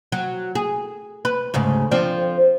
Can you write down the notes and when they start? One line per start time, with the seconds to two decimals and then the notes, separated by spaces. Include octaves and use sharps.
0.12 F#3
0.55 G#4
1.25 B4
1.54 D2 G#2 C#3
1.91 F3 C4 D4